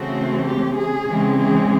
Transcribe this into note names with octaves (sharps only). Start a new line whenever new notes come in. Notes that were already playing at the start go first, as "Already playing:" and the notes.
Already playing: C#3 E3 A3 C4 F#4
G4
G#4
C#3 E3 G#3 C4
G#4